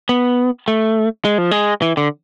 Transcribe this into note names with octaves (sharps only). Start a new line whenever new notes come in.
B3
A3
G#3
F3
G#3
E3
D3